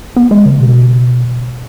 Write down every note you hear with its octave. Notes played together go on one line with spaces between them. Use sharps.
B3
G#3
C#3
B2